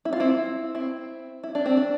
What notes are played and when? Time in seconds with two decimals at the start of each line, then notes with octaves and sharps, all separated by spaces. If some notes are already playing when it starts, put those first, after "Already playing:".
0.05 E4
0.13 F4
0.20 C4 E4
0.75 C4 E4
1.44 E4
1.55 D4
1.66 C4
1.77 D4